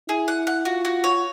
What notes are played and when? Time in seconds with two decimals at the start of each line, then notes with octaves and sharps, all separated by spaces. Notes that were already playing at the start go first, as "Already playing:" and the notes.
0.09 E4 G#4
0.28 F#5
0.47 F#5
0.65 F4 F#4
0.85 F#4
1.04 C#5